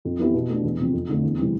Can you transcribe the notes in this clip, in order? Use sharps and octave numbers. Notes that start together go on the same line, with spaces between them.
F2
E3 B3 E4 G4
B2
A3 D4
E2
C3 F3 C4
F2
D3 A3
E2
C3 E3 G3 C4